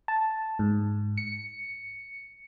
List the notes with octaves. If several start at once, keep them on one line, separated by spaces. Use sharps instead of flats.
A5
G#2
C#7